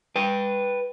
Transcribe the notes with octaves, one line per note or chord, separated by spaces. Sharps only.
B4 G5